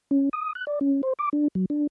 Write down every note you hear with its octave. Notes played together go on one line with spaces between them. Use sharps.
C#4
D#6
F#6
D5
C#4
C5
D6
D4
F#3
D4